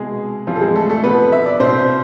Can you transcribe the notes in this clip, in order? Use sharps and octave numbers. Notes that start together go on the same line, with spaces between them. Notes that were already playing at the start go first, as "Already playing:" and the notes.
Already playing: C2 B2 G#3 G#4
F2 E3 F3 F4
A4
G#3 G#4
A3 A4
A3 A4
F2 C3 F3 B3 B4
E5
D5
C2 B2 C4 C5